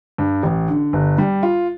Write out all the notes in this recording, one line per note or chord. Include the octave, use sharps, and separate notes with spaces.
G2
A1
D3
G1
G3
F4